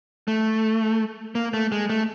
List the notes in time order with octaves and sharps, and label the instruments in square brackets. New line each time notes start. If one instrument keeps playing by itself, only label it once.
[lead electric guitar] A3
A#3
A3
G#3
A3